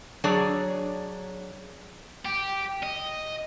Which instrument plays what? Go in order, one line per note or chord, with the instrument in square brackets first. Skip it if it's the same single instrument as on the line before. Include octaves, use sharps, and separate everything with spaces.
[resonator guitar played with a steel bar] F#3 D4 G#4 C#5 D5
[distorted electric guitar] G4
D#5